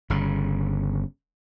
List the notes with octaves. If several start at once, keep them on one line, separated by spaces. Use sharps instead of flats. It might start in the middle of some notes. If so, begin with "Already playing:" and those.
G1 C#3